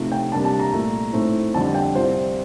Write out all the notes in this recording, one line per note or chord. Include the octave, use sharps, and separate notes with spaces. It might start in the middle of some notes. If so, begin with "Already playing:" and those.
Already playing: C3 F3 A3 D#4
G5
C3 G3 A#3 D4 A5
A5
A#5
C2 A#2 A3
A2 A3 C4 D#4
F2 D3 G3 A5
G5
C2 C3 F3 C5